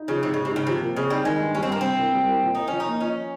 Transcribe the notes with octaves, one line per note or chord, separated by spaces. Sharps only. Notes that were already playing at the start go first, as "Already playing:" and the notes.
Already playing: D#4
C#3 F3
G#2 C3
C#3 G#3
C3
G#2 C#3
C3 F3
A#2
C#3 C4
G3 D#4
D#3 G#3
G2
G3 C#4
C4
G2 A#3
C3 C4
C2
G3
C2
A#2
C2 D#4
F3 C#4
D#4
A#3
F3 C#4